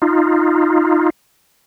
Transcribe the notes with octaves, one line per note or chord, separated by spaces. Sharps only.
D#4 F4